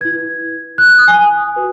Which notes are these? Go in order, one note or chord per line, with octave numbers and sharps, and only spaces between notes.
E4 B4 G#6
F#6
F#6
D#6
G#5
F#4 B4